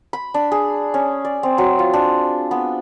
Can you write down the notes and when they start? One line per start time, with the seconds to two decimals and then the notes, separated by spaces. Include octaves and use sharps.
0.13 B5
0.34 D4
0.52 G#4
0.94 C#4
1.25 D5
1.43 C4
1.58 F#3
1.79 F4
1.93 D4
2.51 B3